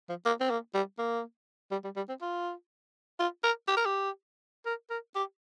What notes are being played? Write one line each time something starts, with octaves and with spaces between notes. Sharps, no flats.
F3
A#3
C4
A#3
G3
A#3
G3
G3
G3
C4
F4
F4
A#4
G4
A#4
G4
A#4
A#4
G4